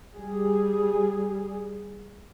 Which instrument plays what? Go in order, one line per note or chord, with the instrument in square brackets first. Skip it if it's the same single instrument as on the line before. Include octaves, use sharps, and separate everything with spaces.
[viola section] G3 G#4